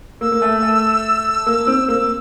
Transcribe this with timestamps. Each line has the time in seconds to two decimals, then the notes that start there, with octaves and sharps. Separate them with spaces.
0.21 A#3 E6
0.32 A#3
0.42 A3
0.63 A3
1.47 A#3
1.67 C4
1.88 A#3 E6